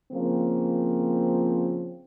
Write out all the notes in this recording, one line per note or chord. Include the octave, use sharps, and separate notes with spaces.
C#3 F3 A#3 C4